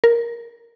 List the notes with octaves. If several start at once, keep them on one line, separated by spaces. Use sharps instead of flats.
A#4